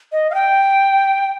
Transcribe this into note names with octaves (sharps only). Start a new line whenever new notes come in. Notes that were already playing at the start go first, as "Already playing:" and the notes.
D#5
F5
G5